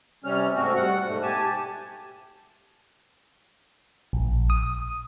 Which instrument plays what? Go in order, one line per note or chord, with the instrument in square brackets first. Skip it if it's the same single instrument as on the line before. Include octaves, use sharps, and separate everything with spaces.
[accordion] C3 G3 C#4 F6
G#2 A3 C4 F#4
G3 F#5
G#2 B2 A3
G4 G#5 A5
[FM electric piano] A#1
D#6